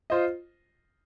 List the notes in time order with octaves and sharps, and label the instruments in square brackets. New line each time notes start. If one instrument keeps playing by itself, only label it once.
[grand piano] F4 C5 D#5